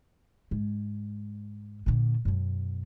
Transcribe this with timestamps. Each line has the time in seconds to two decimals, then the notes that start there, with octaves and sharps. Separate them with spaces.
0.51 G#2
1.86 A#2 D3
2.25 F#2 B2